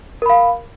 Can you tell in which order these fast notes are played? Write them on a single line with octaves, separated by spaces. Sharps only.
A#4 B5 F5